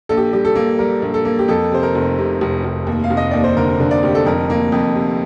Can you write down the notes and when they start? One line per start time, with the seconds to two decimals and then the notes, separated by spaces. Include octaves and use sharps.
0.09 A#1 A4
0.17 G4
0.32 G3 G4
0.45 A4
0.55 A#3
0.79 G3 A#4
1.02 A#1
1.14 A4
1.25 A#3
1.39 G4
1.48 F2 A4
1.71 C3 C5
1.83 A#4
1.95 F1
2.18 C3
2.41 F1
2.64 F1
2.87 D#2
3.04 F5
3.10 F1
3.17 D#5
3.31 D#2 D5
3.44 C5
3.57 D3 A#4
3.80 D3
3.91 D5
4.03 F1 G4
4.15 A4
4.26 F2 A#4
4.50 A#3
4.72 F2
4.95 C3